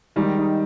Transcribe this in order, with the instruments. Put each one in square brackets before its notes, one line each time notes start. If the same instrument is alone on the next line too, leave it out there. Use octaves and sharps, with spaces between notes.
[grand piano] D#3 G3 [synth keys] G#3
[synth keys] D#4